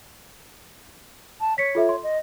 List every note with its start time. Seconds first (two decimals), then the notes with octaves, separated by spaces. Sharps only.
1.40 A5
1.58 C#5 B6 C#7
1.75 F4 A4 E5
1.89 C6
2.03 D#5